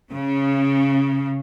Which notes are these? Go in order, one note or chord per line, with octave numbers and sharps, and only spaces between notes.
C#3